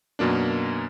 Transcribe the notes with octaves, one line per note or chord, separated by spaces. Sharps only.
F#2 B2 A#3 D4